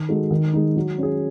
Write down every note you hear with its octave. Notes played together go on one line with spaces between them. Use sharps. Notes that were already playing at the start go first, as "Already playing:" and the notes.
Already playing: D#3
G#3 D#4 F#4 A4
D#3
G#3 D#4
F#3
C#4 G#4